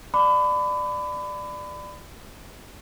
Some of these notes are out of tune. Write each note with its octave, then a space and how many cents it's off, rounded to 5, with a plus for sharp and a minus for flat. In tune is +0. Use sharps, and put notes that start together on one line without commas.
D5 +15 B5 +30 D6 +0